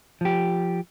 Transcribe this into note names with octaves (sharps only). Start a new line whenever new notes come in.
F3 G4